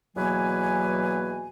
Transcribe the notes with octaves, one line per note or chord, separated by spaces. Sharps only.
E2 B2 F#3 A#3 B4 G#5